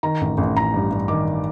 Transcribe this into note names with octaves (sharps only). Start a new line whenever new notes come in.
D#3 A#5
A1
A1
A1 A#5
G2
G2
D#3 D6